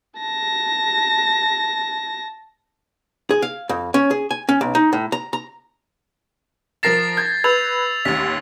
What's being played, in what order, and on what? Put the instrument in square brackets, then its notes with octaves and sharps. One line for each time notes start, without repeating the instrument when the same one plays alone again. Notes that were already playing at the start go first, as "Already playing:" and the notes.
[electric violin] A5 A#6
[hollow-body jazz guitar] G#4
F5
F2
C#4
G#4
G#5
C#4
B1
D#4
A2
A#5
A#5
[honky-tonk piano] F3 A#4 E7 [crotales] A6 A#6 C7
[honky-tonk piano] G6 G#6
[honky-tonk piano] B4 [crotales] E6 G#6 F7
[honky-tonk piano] A1 D#2 [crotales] B6